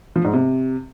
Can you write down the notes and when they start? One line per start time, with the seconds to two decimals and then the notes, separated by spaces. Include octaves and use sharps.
0.16 F3
0.25 G#2
0.33 C3